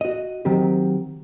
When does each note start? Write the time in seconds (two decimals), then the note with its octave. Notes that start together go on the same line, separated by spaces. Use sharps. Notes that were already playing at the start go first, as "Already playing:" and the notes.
0.01 F#4 D#5
0.45 D#3 F#3 C4 G4